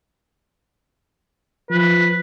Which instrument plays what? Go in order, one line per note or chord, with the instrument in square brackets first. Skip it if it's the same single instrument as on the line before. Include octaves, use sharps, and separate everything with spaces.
[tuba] F3 [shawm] B4